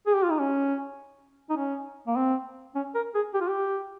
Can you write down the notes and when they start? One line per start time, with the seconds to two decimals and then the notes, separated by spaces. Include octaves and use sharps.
0.07 G#4
0.15 G4
0.23 F4
0.30 D#4
0.39 C#4
1.50 D#4
1.57 C#4
2.07 A#3
2.16 C4
2.75 C#4
2.95 A#4
3.15 G#4
3.34 G4
3.41 F4
3.48 G4